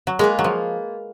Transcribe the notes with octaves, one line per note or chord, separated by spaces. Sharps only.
F#3
G#3 A#3 F4 B4
F#3
F3